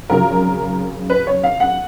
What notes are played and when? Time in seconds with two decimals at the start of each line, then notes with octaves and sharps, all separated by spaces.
0.09 G#1 F#2 C#3 F3 A#4
1.10 B4
1.27 C#5
1.44 F5
1.60 F#5